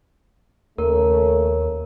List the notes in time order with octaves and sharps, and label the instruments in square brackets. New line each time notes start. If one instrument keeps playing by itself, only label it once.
[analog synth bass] D#2 [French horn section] C#3 A3 C#5 [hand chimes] A#4